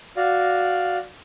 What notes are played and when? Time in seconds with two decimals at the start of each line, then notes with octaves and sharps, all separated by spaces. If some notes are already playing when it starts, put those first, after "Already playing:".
0.17 F#4 D5 F5